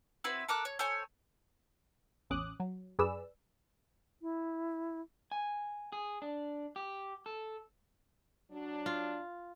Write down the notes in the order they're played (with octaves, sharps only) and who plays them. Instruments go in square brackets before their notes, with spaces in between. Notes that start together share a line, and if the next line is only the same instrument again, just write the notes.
[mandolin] C4 E4 F#4 B4
A4 A#4 D6 F#6
C#5
A4 C5 C#5 G#5
[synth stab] A1 E2 C#4 D6 D#6 F#6
F#3
F#2 G#4 B4 D5 E6
[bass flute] E4
[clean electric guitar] G#5
G#4
D4
G4
A4
[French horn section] F#3 D4
[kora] F4